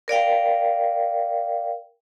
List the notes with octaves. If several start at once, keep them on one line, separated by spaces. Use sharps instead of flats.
A#4 D5 F5 G5